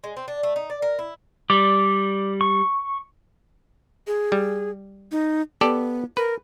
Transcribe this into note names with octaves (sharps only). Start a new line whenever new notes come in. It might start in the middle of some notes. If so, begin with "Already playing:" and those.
G#3
C4
D4
A3
D#4
D5
A#4
E4
G3 D5 D6
C#6
G#4
G3
D#4
B3 G4 A4 D5
A#4 B4